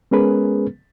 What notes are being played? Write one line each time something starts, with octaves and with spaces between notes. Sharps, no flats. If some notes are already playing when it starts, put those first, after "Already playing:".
G#3 B3 C#4 G#4 A#4 B4